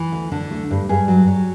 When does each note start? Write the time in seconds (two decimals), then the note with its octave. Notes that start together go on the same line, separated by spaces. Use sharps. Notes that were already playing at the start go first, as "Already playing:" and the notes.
Already playing: E3
0.12 D2
0.32 D3
0.51 A3
0.70 G2
0.89 G2 G#4
1.08 F#3
1.28 F#3